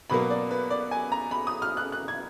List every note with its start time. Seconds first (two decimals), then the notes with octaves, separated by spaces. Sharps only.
0.10 B2 F#3 A#3 B5
0.30 D5
0.51 B4
0.70 D5
0.91 G#5
1.12 A#5
1.31 B5
1.47 D#6
1.62 F6
1.77 F#6
1.92 F#6
2.08 G#6